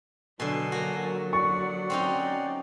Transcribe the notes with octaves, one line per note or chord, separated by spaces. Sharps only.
B2 D3 F#3 G#5 A5 C6
A#3 F#4
D5 F#5 C#6
C4 C#4 D#4